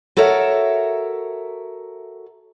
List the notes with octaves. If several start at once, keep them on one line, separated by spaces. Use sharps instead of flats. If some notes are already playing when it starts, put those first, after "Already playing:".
F#4 A4 A#4 C#5 E5